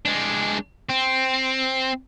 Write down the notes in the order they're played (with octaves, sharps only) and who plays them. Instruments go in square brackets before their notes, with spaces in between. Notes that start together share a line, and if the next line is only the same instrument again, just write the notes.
[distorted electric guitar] G#3 D4
C4